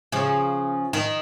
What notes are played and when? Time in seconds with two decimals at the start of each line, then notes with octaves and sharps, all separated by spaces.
0.12 C#3 F3
0.93 D#3